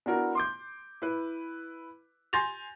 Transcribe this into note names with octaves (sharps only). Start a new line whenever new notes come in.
B3 D4 E4 F#4 A#4
C6 D6 G6
E4 B4
G#5 C6 G6 A6 A#6 F7